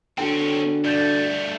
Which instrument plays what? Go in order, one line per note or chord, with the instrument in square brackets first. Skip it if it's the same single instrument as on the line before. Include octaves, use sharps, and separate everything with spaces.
[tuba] D3 [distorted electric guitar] C4 C#4 [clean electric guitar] F#4 A4 G5
[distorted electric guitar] G2 A3 [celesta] D5 G6 A6